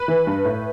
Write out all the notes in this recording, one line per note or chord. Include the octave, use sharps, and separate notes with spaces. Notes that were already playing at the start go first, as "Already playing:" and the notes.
Already playing: B4
E3
G2
A2